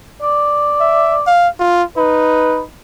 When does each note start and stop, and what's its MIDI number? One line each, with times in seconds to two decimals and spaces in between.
0.22 1.27 74
0.81 1.16 76
1.27 1.48 77
1.60 1.83 65
1.97 2.67 63
1.97 2.60 71